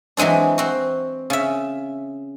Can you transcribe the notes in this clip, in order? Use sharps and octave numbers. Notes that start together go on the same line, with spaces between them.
E3 F#3 G#3 C4 D4
C4 F#4
C#3 E5